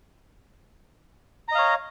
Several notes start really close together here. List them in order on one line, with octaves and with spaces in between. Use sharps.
A#5 D#5 F5 C#5